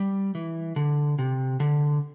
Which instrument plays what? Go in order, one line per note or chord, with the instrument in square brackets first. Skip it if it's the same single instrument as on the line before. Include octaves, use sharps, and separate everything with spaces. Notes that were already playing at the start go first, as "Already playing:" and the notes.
Already playing: [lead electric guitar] G3
E3
D3
C3
D3